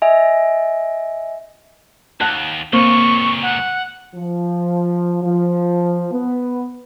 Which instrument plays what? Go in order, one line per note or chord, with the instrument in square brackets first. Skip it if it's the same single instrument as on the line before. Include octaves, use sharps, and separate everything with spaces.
[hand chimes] D#5 E5 G#5
[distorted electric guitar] D#2 [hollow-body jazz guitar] F#5 A5
[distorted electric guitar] C#2 A#2 [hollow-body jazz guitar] A#3 C4 [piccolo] C#6
[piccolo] F#5
[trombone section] F3
F3
B3